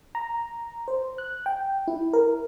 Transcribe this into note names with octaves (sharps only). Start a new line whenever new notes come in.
A#5
C5
F#6
G5
E4
A#4